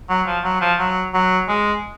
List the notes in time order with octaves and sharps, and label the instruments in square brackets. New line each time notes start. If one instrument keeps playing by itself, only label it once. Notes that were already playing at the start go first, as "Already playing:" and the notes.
[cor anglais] F#3
F3
F#3
F3
F#3
F#3
G#3